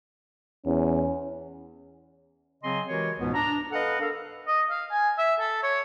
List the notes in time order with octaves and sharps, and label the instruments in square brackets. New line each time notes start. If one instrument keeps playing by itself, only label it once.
[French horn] E2 [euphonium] C#4
[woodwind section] C#3 F#3 C4 D#5 G#5 C6
E3 G#3 F#4 G4 A#4 C#5
C#2 G#2 B2 E3 B3
D4 A#5
A4 B4 D#5 F5 F#5
D4 A4 A#4 F5
[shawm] D#5
F5
G#5
E5
A4
C#5